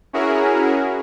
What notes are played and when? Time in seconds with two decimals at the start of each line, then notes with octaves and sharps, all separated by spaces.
0.13 C#4 E4 F#4 G#4 A#4